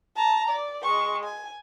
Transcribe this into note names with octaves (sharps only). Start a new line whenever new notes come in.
A5 A#5
D5
G#3 C#6
G#5